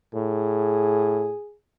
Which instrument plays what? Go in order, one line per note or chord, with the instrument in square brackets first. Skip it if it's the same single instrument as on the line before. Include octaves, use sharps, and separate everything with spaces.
[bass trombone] A2 [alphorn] G#4